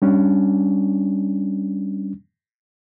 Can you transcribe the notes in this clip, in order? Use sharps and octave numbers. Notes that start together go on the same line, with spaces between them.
G3 C#4 D4